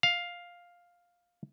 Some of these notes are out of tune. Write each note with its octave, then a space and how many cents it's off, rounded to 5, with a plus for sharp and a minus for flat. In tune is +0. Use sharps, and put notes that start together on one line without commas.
F5 +5